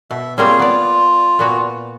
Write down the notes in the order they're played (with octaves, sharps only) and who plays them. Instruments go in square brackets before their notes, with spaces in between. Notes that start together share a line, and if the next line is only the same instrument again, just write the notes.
[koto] B2 [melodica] E5
[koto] G3 A#3 C4 [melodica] F4 G#4 C#5
[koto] B3 D5 [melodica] F4
[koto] A#2 B3 F#4